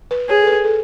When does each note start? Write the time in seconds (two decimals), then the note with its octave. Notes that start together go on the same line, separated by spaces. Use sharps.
0.11 B4
0.29 G#4 C#5
0.42 A4
0.47 B4
0.64 A4